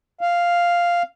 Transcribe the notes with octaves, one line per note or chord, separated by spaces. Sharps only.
F5